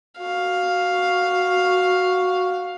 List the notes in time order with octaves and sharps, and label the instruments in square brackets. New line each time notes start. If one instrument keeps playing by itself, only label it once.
[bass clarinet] F#4 [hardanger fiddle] F5